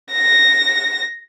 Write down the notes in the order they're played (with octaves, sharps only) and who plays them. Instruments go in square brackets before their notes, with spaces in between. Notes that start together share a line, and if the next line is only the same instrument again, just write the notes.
[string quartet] A#6